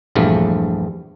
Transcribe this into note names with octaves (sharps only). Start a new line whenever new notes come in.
A#1 E2 G2 F3 A3